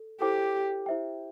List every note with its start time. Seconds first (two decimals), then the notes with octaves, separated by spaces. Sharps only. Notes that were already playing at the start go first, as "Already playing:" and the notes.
Already playing: A4
0.21 E4 G4 A4 C5 G5 D6
0.86 E4 C5 E5 G5